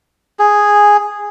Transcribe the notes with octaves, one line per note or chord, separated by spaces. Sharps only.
G#4